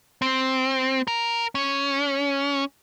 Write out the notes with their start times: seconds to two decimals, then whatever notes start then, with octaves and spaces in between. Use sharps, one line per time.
0.22 C4
1.08 A#4
1.55 C#4